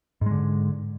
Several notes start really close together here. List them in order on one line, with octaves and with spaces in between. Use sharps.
G#2 G#3 D3